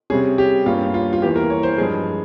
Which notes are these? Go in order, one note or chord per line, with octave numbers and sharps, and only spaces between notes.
C3 G3 C#4 G#4
G4
G2 G3 A#3 C#4 F4
F4
F4
E2 E3 A#3 G4
A#4
C#5
C5
G2 F3 G#3 G#4